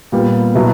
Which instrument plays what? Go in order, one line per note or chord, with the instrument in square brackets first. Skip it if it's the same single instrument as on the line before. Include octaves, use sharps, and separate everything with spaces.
[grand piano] A#2 G3 B3
B2 F#3 B3 E4